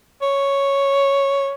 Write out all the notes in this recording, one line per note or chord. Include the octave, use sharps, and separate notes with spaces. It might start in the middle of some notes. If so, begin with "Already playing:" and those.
C#5